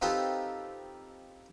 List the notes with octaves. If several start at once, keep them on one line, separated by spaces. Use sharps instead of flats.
C4 D#4 F4 G4 A4 B4